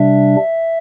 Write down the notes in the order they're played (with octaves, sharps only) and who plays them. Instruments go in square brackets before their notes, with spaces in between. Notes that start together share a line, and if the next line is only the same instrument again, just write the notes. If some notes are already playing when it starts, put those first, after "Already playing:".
Already playing: [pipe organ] C3 G3 D4 E5